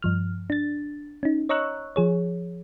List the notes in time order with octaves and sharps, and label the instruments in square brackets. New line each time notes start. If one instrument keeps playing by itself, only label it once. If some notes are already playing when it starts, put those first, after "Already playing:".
[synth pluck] G2 F3 F6
D4 A6
C#4 D#4
C#5 D#5 A#5 C#6 E6 F#6
F3 G#4 C#5